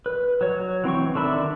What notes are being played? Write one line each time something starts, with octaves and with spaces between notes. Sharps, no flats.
B4
F#3 C#5
E3 C4 G5 C#6
D3 D#3 D4 E5 B5